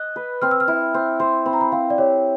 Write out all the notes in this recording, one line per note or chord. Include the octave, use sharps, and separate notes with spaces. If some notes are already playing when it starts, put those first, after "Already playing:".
Already playing: D#5 F#6
B4
C4 F6
E6
F6
E4
C4
C5 C6
C4 B5
A#5
B5
C4 F5
D5
G4 C#5